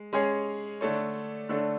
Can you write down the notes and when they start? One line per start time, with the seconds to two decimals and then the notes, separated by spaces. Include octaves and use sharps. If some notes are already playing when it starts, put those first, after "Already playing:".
Already playing: G#3
0.13 G#3 C#4 G#4 C#5
0.81 D3 A3 D4 A4 C#5
1.49 D3 A3 D4 A4 C#5